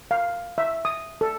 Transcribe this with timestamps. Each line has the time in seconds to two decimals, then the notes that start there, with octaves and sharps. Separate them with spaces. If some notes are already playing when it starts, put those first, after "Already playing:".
0.11 F5
0.58 E5
0.85 D#6
1.21 A4